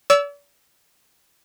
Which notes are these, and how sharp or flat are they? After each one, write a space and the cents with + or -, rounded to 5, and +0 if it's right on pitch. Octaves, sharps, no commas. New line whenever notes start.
D5 -45 E6 +0